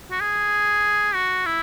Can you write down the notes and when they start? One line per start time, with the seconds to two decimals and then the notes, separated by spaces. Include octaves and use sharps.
0.11 F#4
0.21 G#4
1.15 F#4
1.46 E4